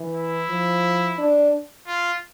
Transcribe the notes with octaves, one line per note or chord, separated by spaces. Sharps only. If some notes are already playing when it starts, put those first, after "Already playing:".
Already playing: E3
E4
F3
D4
F4